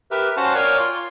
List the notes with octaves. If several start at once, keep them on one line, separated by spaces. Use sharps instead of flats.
G4 A#4 B4 E5
C#4 F#4 C5 F5 F#5 A5
A#4 C#5 D5 F5 G5 G#5
F4 C6